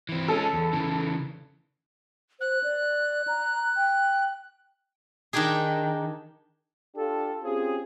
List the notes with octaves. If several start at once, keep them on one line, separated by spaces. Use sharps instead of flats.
E3 C4
G#3 C#4 A4
E2
C#3 E3
C5 F#6
D5
A#5
G5
D#3 D4 D#4 G4 G#4
D4 F4 G4 A4
C4 C#4 F4 G4 G#4